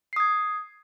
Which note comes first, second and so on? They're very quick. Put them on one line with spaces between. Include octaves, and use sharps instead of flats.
C7 D#6 G#6